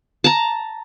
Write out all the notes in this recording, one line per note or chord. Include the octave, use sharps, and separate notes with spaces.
A5 A#5